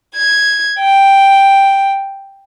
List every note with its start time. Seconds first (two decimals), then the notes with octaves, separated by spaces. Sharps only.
0.15 G#6
0.77 G5